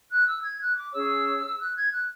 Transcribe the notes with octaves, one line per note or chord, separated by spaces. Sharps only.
F#6
E6
G#6
F#6
D6
C#4 G#4 C#5 E6
F#6
G#6
F#6